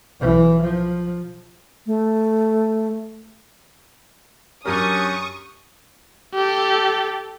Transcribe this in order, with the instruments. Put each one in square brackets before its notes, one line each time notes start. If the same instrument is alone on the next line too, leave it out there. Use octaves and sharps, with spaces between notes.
[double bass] B1 E3
F3
[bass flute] A3
[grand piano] F#2 A#4 [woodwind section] F#3 D4 G4 [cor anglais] C#4 [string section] C#6 D#6
[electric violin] G4 A4